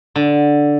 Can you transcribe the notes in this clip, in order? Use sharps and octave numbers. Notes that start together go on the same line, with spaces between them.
D3